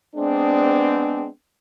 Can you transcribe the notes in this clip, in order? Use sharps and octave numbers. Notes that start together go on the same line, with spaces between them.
G#3 B3 C4 D4